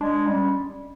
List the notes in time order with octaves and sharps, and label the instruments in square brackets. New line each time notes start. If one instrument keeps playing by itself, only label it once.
[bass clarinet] G#3 [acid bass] D4
[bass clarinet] G3 [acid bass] C#4